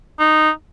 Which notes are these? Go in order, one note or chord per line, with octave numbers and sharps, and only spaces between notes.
D#4